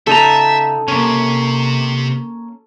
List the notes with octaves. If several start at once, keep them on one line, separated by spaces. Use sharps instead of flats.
C#3 D#4 A4 E5 A#5
C3 A#3 C#4